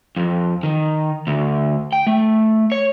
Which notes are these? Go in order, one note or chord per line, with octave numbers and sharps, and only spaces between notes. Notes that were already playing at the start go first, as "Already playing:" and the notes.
F2
D#3
D2
G5
A3
C#5